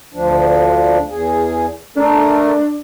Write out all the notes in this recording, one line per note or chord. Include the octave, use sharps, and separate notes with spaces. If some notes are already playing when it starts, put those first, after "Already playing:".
D2 F3 D4
E2 G#4
A3 D4 A4 A#4